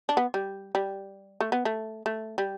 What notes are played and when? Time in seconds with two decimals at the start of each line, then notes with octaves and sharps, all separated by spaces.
0.09 D4
0.17 B3
0.34 G3
0.75 G3
1.41 A3
1.52 B3
1.65 A3
2.06 A3
2.38 G3